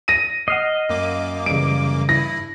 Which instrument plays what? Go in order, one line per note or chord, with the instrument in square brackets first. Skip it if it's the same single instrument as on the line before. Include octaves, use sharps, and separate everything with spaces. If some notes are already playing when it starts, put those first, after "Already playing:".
[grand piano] A#6 D#7
[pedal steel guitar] D#5 [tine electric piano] F#5 F6 C7
[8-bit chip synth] F#2 A#3 D6
[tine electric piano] C#3 E3 G3 [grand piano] D7
[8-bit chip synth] G2 E4 [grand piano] A#6